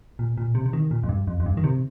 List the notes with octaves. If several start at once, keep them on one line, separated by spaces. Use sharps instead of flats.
A#2
A#2
C3
C3
D#3
A#2
F2
G2
F2
F2
G2
D#3
C3